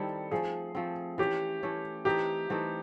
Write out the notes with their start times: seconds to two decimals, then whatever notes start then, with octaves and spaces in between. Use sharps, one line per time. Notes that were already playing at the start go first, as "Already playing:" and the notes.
Already playing: D#3 G3 C4 E4 A4
0.31 F3 A3 C4 G#4
0.75 F3 A3 C4
1.18 E3 A3 C#4 G4
1.63 E3 A3 C#4
2.05 E3 A3 C4 D#4 G4
2.50 E3 A3 C4 D#4